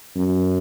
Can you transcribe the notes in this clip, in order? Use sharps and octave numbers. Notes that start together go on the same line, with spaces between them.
F#2